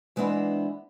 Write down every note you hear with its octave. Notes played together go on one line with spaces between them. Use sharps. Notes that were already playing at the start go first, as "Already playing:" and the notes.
E3 G#3 B3 C4 D4 E4